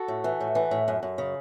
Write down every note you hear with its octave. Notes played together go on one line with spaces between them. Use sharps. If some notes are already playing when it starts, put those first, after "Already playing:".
Already playing: F#4 A4
A2
E3
A2
E3
A2
F#2
F#2
C#3